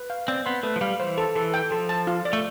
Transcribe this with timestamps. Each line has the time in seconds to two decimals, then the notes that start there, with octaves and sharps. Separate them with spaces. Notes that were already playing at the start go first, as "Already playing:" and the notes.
Already playing: B4
0.10 F5
0.28 C4 D5
0.46 B3 C6
0.63 A3 B4
0.76 F3
0.81 G3 F5
1.00 E3 C5
1.18 A4
1.35 E3 A4
1.54 G5
1.71 F3 A4
1.89 A5
2.07 F4
2.25 D5
2.33 A3